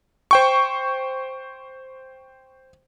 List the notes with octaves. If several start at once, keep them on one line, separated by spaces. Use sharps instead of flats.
C5 G5 C#6